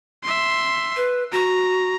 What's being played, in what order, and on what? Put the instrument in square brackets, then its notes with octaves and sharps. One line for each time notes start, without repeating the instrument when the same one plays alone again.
[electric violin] E5 C6
[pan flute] B4
[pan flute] F#4 [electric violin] A#5